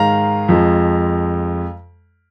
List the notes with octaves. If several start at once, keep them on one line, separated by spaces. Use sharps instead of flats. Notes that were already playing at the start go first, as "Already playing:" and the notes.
Already playing: G#2 D#3 G#3 F5 A#5
F2 F3 G#3